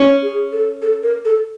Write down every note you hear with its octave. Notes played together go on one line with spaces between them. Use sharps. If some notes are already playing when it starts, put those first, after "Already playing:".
Already playing: C#4
G#4
A4
A4
A#4
A4